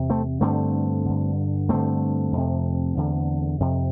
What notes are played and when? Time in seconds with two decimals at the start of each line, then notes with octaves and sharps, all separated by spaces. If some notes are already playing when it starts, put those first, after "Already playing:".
Already playing: E2 C3
0.10 A3 C4
0.41 G2 D3 A3 C4
1.06 G2 D3
1.69 G2 D3 A3 C4
2.33 F2 C3
2.97 E2 D3
3.60 F2 C3